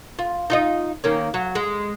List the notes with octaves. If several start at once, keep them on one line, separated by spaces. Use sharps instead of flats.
F4
D#4 F4 D#5
D#3 A#3 C#4
F#3
G#3